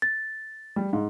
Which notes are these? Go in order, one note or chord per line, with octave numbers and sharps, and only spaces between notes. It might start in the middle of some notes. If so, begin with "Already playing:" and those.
A6
G3
G#2